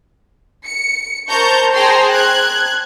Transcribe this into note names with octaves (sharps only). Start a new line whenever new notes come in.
C#7
A#4 C5 A5 A#5 C#6 G6
G#4 C5 G5 A5 A#5 C6
F#6 G#6